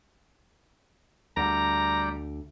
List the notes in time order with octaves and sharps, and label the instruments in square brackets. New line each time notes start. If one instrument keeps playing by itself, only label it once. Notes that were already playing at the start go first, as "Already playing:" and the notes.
[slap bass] D2 [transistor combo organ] G3 D5 [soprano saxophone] A#5